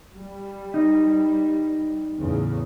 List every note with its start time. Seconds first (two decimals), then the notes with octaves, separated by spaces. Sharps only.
0.13 G3
0.74 D#4
2.18 E2 A2 C#3